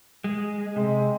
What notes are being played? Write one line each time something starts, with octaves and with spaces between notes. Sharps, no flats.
G#3
C3 G#3